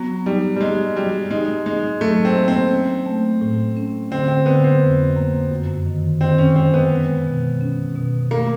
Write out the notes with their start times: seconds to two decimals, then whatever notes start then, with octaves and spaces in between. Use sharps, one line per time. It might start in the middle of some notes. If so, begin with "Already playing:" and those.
Already playing: F#3 B3
0.26 G3 D#4
0.56 G3
0.61 G#3 D#4
0.96 G3 F#4
1.31 G#3 D#4
1.66 G#3 D#4
2.01 F#3 A3
2.25 C4
2.36 A#3
2.48 C4
2.70 C#4
3.06 A3
3.41 A2
3.77 C#4
4.11 D3 C4
4.28 C4
4.46 D3 B3
4.64 C4
4.82 F2
5.16 A#3
5.51 F#2
5.86 D#3
6.21 D#3 C4
6.38 C#4
6.56 G#3 C4
6.74 B3
6.91 G#3
7.26 B2
7.61 C#4
7.96 B2
8.31 A3 A#3